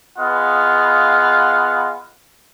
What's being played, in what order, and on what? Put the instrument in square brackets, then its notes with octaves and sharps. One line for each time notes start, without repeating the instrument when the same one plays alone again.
[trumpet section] B3 F4 G#4 D#5 F5 F#5